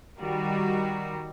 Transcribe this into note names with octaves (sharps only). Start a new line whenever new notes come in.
D#3 G3 F#4